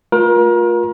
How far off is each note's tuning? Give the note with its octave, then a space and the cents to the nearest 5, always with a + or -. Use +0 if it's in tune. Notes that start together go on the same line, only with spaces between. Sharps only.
A3 +0 F4 +25 A#4 +35